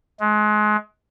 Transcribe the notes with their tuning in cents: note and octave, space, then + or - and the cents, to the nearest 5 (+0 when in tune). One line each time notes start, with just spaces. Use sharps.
G#3 +30